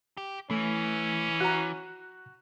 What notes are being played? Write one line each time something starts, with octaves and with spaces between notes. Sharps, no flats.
G4
E3 A3 C#4
F#4 A#5 F#6